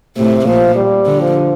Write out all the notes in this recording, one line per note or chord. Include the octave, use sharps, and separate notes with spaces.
A2 C3
A#2 F3
G3
D3
F3